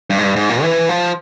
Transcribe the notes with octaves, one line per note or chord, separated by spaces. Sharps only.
G2
G#2
G2
G#2
A#2
E3
F3